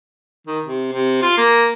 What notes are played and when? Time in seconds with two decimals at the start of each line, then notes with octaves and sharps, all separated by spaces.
0.47 D#3
0.64 C3
0.92 C3
1.22 F4
1.37 A#3